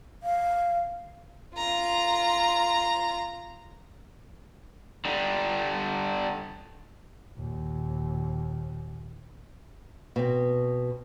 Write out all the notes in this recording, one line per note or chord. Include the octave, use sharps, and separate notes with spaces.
F5
F4 A#5
D3 G3
D#2 A#2
B2 C4